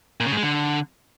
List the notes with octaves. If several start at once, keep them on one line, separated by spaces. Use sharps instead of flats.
A#2
C#3
G#2
G#3
D3